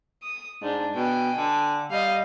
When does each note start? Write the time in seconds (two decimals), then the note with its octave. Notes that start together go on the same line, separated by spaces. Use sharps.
0.23 D#6
0.63 G#2 D4
0.95 B2 G5 G#5
1.38 D3
1.91 G3 D#5 F5